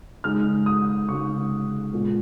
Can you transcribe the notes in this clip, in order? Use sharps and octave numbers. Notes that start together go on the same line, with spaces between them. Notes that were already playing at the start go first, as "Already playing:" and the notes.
C#3 G#3 D#4 F6
D#6
C#3 G#3 D#4 C#6
A#2 G#3 B3